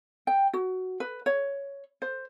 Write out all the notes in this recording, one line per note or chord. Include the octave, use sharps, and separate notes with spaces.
G5
F#4
B4
C#5
C5